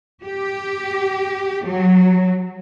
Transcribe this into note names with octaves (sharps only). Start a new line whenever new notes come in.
G4
F#3